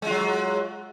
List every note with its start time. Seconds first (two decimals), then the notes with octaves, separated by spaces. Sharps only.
0.02 G#3
0.06 F4
0.10 F#3